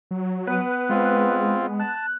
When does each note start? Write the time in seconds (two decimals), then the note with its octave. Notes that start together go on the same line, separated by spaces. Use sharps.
0.11 F#3
0.47 B3 B4
0.89 G#3 C4 F4
1.80 A5 F#6